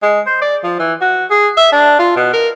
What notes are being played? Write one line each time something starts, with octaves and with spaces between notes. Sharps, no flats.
G#3
C5
D5
F3
E3
F#4
G#4
E5
D4
F4
B2
A#4